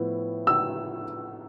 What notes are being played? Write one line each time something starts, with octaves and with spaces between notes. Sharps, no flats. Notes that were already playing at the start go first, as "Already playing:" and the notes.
Already playing: A2 F3 B3 E4
E6